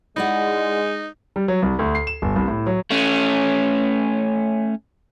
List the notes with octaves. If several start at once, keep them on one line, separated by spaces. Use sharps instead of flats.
G#3 D#4 E4 D5 F#5
G3
F#3
C2
D2
C7
E7
G1
C2
A2
F#3
A3 C#4